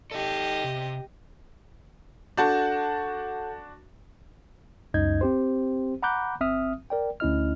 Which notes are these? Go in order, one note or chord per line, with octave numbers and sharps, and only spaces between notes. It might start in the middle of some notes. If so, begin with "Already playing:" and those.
D#4 G4 A4 D#5
C3
D4 F#4 A4 F#5 A5 G6
C#2 F#2 D#4 D#5 G6 G#6
C4 G4 C5
F#5 A#5 B5 D6 F#6 G6
G1 C4 E5 D#6 F6
A#4 D5 G5
D2 C#4 E4 D#5 F6